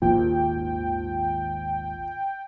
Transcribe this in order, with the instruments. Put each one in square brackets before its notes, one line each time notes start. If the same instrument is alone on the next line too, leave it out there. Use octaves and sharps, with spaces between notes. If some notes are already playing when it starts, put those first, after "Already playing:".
[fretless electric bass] G#1 D#2 A#2 [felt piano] F3 [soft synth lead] G5